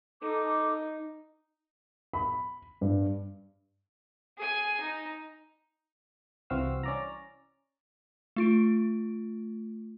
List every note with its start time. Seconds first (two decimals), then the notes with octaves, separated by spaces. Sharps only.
0.22 D#4 A4 D6
2.13 B5
2.81 G2
4.38 G#4 G#5
4.80 D#4
6.50 C2 E3 C4 F#4 F5 E6
6.83 C#4 D5 A#5
8.36 A3 F4 D7